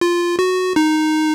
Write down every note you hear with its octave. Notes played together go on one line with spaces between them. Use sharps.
F4
F#4
D#4